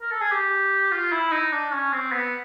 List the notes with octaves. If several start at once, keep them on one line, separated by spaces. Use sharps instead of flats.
A#4
A4
G#4
G4
F4
E4
D#4
D4
C#4
C4
B3